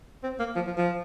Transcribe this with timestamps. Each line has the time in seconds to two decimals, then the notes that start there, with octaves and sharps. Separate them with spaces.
0.24 C4
0.39 A#3
0.56 F3
0.67 F3
0.77 F3